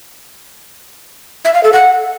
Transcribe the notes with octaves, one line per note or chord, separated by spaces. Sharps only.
E5
F5
A4
F#5